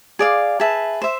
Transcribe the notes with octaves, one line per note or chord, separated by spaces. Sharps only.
G#4 D5 F5
G#4 B4 E5 A5
C5 E5